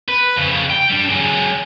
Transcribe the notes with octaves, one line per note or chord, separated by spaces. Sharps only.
B4
F2 C#3
G5
G3 D4
F#3 G#3